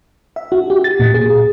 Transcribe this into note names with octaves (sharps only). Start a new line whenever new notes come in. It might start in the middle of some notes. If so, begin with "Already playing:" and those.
E5
F#4
G4
A6
A#2
G#4